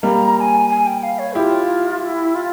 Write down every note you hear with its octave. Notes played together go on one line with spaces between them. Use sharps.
G3 A#3 A#5
A#5
G#5
G#5
G5
F5
C#5
E4 F4 G4
F4
E4
F4